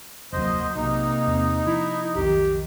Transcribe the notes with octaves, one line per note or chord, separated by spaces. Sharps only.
F1 D2 F#3 A#3 C5 D#5
B1 C3 A#3 D#4
E2 C4
F3 E4
B1 F2 D#3 G4